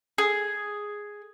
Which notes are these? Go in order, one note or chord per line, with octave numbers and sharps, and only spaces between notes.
G#4